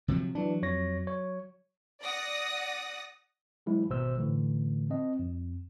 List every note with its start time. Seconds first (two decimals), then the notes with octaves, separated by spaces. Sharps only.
0.08 C3 F3 F#3
0.35 E3 F#3 D4
0.62 F2 C#5 A#6
1.07 C#5
2.02 D5 F#5 D#6 A#6
3.66 E3 F#3 G#3 E4
3.89 G#1 B2 C5 E6
4.17 A2 D3 E3 A3
4.90 C4 D#5
5.19 F2